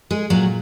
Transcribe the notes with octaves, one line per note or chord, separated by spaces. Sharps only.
G#3 G#4
A#2 F#3 F#4